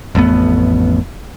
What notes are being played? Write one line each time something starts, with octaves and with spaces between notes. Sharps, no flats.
A1 F2 A3 B3